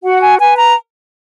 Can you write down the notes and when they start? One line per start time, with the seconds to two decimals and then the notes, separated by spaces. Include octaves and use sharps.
0.04 F#4 F#5
0.22 G#5
0.39 B4 G#5
0.56 A#5